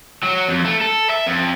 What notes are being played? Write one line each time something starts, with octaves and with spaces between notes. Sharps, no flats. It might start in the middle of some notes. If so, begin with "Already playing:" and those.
F#3
F2
A3
A4
E5
F2